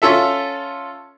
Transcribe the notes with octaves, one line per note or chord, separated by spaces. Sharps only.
C#4 F4 A4 E5